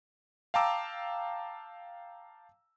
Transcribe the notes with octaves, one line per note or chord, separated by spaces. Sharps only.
F5 G5 A5 A#5 D6 E6